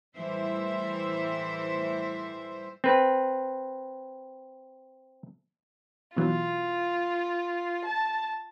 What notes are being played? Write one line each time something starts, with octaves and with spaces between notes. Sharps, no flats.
A2 E3 G3 C5 E5
C4 B4
B2 E3 F#3 F4
A5